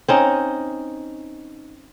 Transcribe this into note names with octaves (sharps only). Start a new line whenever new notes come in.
C4 C#4 D#4